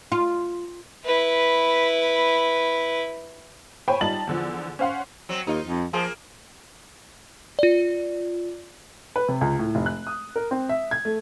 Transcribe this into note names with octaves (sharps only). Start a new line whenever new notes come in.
F4
E4 B4
C5 C#5 G5 G#5 B5 C#6
G3 D#4 F4 A5 A6 F#7
E2 D3 F3
C#4 C5 F5 F#5 C6
F#3 C4
D#2 D#4 F4
F2
F3 A#3 F4 G#4
F4 D5
B4
C3
C#2
A2
F1
F#6
D#6
A#4
C4
E5
G#6
A3